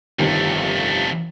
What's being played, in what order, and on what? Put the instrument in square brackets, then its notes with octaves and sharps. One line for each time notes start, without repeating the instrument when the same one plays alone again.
[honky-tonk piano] G1 C3 D#3 [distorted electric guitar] F2 A3